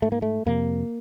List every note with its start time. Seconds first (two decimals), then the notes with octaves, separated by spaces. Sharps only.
0.02 G#2 A3
0.12 A#3
0.22 A3
0.46 F2 C3 A#3